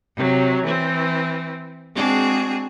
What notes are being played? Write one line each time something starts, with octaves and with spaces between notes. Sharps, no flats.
C3 F#3
E3 C4
G#3 C4 D4 F#4 G#4